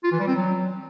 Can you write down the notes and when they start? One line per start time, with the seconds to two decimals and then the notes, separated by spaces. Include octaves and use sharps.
0.04 F4
0.12 E3
0.20 G3
0.28 C4
0.35 F#3